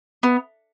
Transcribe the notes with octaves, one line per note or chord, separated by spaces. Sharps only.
B3